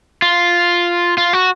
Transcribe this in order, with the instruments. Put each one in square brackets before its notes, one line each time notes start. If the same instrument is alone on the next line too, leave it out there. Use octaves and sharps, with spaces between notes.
[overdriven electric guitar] F4
F4
F#4